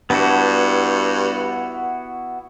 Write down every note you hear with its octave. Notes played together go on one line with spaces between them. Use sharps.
G2 B3 E4 F#4